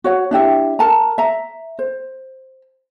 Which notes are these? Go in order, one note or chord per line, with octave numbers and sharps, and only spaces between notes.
F#4 C#5 F#5
D4 E4 G4 E5
A#4 A5 A#5
E5 A#5
C5